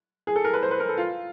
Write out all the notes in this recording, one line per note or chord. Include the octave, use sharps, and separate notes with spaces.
G#4
A4
A#4
B4
C5
B4
A#4
A4
F4